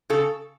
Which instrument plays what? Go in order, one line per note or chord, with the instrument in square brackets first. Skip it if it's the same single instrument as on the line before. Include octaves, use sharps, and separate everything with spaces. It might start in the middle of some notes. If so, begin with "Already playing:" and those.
[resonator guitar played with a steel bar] C#3 A4